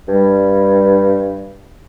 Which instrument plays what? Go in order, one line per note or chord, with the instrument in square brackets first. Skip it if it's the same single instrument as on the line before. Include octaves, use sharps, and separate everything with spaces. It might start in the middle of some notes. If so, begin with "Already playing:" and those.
[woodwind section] G2 G3